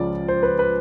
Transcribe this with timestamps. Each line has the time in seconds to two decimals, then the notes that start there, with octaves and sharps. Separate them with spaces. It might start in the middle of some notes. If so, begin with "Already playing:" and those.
Already playing: C#2 C#3 F3 D5
0.28 C5
0.43 B4
0.59 B4